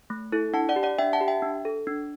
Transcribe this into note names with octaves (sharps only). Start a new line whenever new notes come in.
A3
E4 A4
D4 F#5 A5
D5 F#5
G4
D5 F#5
D4 E5 G5
F#5 A5
G4
E5 G5
D4
A4
D4